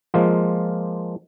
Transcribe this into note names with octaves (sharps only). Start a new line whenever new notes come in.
F3 G#3 A#3 F4